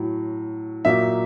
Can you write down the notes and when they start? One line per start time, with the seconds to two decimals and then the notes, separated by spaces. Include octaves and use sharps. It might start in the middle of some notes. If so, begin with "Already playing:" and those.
Already playing: A2 F#3
0.85 A#2 F#3 A#3 D#4 E5